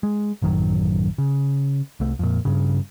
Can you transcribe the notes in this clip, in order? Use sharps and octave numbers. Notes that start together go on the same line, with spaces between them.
G#3
A1 F#2 D#3 F#3
C#3
C2 A3
F2 A#2
G2 C#3